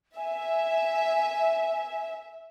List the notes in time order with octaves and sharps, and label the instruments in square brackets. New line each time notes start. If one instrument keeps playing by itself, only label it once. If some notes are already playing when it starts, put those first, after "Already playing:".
[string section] E5 [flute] G#5